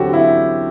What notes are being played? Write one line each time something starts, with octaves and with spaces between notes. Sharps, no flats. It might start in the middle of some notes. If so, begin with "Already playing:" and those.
Already playing: D3 F#3 C4 F#4 G4 A4
E4